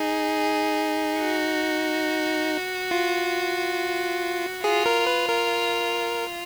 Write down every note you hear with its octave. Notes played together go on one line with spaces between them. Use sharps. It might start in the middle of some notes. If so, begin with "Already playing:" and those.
Already playing: D#4 G#4
F#4
F4
F4 G#4
A#4
B4
A#4